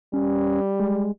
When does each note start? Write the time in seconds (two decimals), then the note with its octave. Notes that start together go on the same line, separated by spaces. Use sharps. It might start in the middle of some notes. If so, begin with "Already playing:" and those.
0.13 G3 C#4
0.80 G#3